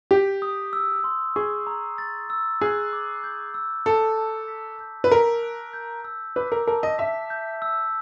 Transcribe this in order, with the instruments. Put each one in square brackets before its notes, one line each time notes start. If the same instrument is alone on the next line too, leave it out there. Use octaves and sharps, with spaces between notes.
[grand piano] G4 [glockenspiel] G6
[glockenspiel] D#6
E6
C6
[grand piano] G#4 [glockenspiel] C#6
[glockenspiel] A#5
A6
E6
[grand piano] G#4 [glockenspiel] F#6
[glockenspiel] D6
G6
E6
[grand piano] A4 [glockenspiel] D6
[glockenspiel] A5
B6
G6
[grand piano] B4
[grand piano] A#4 [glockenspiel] B6
[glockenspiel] F#6
G6
E6
[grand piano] B4 [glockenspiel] D6
[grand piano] A#4
[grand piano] A#4 [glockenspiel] A5
[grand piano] D#5
[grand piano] E5 [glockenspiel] B6
[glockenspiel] G6
E6